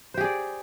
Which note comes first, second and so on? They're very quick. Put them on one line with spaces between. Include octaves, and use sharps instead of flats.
C5 G4 G#4 D5